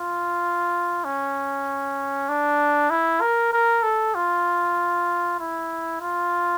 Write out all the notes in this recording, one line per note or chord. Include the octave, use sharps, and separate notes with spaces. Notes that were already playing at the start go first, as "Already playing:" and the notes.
Already playing: F4
C#4
D4
E4
A#4
A#4
A4
F4
E4
F4